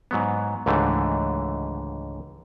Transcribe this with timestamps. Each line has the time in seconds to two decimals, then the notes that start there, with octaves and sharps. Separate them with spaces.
0.11 G#2 F#3 B3
0.66 C#2 G#2 D3 E3 A3